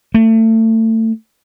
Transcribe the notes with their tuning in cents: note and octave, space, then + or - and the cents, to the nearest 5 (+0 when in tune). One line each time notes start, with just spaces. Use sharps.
A3 +30